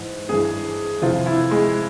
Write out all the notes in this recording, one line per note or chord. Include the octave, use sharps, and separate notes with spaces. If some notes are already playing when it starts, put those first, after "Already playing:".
Already playing: G#2 E3
G2 E3 G#4
F2 C3 E3 F4
E4
G#3